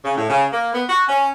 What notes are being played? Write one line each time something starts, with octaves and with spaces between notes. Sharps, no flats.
C#3
A2
C#3
A#3
B3
F#4
C#4